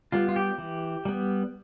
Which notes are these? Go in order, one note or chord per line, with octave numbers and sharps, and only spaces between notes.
G3 B3 F4
F4
G4
E3
G3 B3